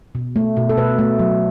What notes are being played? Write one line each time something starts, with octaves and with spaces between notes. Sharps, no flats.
B2
A3
B2
A4
B2 B4
A3
F#3